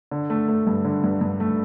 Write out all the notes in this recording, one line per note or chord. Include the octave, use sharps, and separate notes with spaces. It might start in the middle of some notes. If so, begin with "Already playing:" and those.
D3
A3
A3
G2
D3
G2
G2
A3